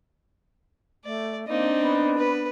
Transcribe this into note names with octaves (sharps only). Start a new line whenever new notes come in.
A3 D5
A#3 C4 D4 D#4
B3
B4